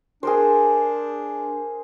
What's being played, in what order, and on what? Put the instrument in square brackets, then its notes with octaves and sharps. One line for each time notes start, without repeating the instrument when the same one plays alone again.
[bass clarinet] D4 [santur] G#4 A#4 C5